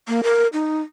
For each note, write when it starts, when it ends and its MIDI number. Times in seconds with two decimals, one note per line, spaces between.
0.08 0.21 58
0.24 0.47 70
0.53 0.82 63